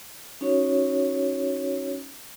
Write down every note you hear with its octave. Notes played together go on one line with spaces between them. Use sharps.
C#4 D#4 F#4 C#5